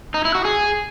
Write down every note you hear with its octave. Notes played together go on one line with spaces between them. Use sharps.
D#4
E4
F#4
G#4